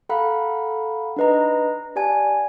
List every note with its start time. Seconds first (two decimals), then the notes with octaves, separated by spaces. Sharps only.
0.09 A4 F5 F#5 A#5 B5
1.16 D4 D#4 B4 D#5 A#5
1.96 G4 D5 F#5 G#5 A5